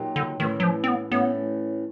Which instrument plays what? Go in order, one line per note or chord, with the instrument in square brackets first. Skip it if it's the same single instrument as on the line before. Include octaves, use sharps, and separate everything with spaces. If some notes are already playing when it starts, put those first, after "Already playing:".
Already playing: [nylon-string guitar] A#2 F#3 A#3 D#4 G4
[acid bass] D3
[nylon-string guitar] A2 E3 A3 C#4 [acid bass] D#3
[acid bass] F#3
F3
C4
B3
[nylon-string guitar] A2 E3 A3 C#4 [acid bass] B3